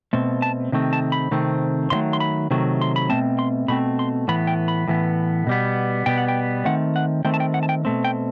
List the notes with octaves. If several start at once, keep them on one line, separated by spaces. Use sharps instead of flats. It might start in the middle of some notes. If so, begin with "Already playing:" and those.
B2 A3 C4
A5
C3 D#3 A3 C4
A5
B5
C3 D#3 A3 C4
C3 D#3 F#3 A3 C6
C6
B5
C3 D#3 F#3 A3
C6
B5
B2 A3 C4 A5
C6
B2 A3 C4 B5
C6
A2 E3 B3 B5
G5
B5
A2 E3 B3
B2 G3 B3
B2 G3 B3 G5
F#5
G5
D#3 A3 C4 F#5
F#5
D#3 A3 C4 G5
A5
G5
F#5
A5
G5
B2 A3 C4
G5